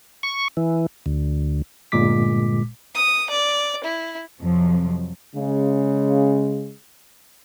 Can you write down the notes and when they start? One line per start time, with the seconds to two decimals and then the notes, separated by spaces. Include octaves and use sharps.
0.23 C#6
0.57 E3
1.06 D2
1.92 G1 A#2 G#3 D6 B6
2.95 D#6
3.30 D5
3.84 E4
4.41 F2 C3 F3 F#3
5.36 C#3 G#3